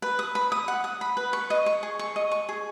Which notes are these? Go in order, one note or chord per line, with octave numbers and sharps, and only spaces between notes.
B4
D#6
B5
D#6
F#5
D#6
B5
B4
C#6
D#5
C#6
G#4
C#6
D#5
C#6
G#4